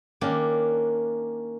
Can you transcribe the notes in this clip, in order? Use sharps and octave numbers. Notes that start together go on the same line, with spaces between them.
D#3 A#3 C#4 D4